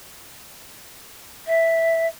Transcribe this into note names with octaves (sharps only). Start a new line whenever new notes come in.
E5